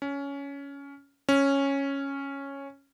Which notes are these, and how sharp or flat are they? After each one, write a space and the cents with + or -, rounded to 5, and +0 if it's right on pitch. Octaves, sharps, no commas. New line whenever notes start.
C#4 +15
C#4 -5